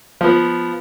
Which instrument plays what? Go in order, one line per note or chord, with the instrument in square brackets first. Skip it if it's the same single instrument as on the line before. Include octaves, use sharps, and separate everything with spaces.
[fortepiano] F3 B3